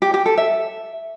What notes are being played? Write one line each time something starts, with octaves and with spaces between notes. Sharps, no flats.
G4
G4
A4
E5